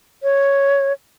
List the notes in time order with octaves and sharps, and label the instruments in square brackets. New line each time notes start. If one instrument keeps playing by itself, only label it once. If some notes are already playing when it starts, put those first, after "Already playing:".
[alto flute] C#5